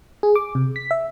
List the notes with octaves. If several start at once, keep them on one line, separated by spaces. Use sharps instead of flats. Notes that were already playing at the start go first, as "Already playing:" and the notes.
G#4
D6
C3
B6
E5